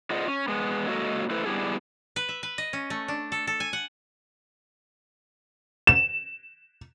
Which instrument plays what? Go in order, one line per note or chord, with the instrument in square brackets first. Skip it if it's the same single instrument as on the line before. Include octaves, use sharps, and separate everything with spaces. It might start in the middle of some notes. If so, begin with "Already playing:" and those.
[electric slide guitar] F4 G#4 C5 D5 D#5 F#5
C#4
G#3 B3
F#3 G#3 A#3 F#4 A4 D#5
A3 E4 A4 B4 C5
G3 B3 D4 E4 G4 G#4
[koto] B4
E5
B4
D#5
C#4
A3
D4
A4
A4
G#5
F#5
[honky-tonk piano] E7